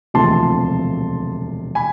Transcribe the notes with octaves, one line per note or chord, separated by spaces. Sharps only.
E1 D2 C3 F3 A3 A5 C6
G#5 B5